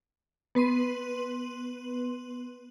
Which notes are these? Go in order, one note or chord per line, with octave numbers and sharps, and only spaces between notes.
B3 B4 C6 D#7